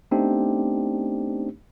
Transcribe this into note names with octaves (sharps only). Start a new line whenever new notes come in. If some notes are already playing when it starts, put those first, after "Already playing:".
A3 B3 C4 D4 D#4 G4